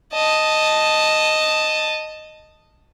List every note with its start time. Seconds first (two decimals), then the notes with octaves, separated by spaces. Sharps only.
0.13 D#5 A5